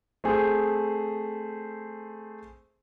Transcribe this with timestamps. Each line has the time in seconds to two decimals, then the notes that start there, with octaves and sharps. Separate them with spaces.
0.24 A3 C4 G#4 C5